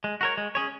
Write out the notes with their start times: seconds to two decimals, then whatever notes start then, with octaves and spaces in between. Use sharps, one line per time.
0.04 G#3
0.21 F#4 A#4 C#5
0.38 G#3
0.55 C#4 G#4 C#5